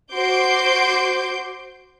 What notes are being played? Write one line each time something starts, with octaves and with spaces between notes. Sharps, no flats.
F#4 C5 C6 D6 G6 D7